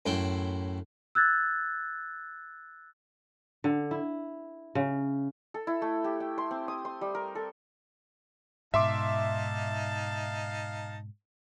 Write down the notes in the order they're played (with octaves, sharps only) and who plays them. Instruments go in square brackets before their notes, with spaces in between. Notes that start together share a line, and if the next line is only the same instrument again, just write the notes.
[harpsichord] F#2 A2 E4 G5 C6
[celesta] E6 F#6 G#6 A6
[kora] D3
E4
C#3
[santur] A4
E4
A3
G4
G5
C6
C4
D#6
C6
G3
A#4
A4
[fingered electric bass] G#2 B2 [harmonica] D#4 F5 A5 [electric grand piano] E5 C6 D6